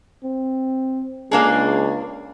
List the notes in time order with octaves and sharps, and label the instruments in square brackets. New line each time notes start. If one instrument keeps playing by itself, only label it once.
[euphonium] C4
[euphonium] C#2 [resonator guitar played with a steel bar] A#3 D4 G#4